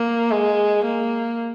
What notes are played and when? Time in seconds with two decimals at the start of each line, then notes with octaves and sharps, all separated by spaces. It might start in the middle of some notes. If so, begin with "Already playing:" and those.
Already playing: A#3
0.31 G#3
0.84 A#3